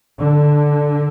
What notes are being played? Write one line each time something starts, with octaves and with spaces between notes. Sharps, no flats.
D3